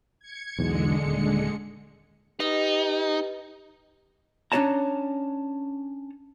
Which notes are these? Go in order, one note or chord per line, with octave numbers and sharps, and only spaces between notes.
G#6 C#7
B1 E2 D3 G#3 C#7
D#1
D#4 G4 B4 D#5
C#4 D4 E4 C#5 A5 A#5